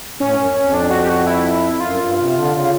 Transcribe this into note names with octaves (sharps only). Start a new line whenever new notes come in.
A2 C#4
F#2
F2
F2
D4
F#4
G4
F#4
E4
F2
F#2 F4
G2
C3
D3
C#3